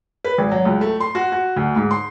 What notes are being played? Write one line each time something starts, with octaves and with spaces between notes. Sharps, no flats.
B4
G#1
F#3
C#2
A3
C6
F#4
F#4
D2
G#2
C6